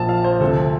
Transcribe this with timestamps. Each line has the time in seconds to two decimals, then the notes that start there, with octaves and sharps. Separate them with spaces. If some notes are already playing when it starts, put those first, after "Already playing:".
Already playing: A#1 A#2 F3 A5
0.09 F5
0.24 C5
0.40 D2 C3 F3 A4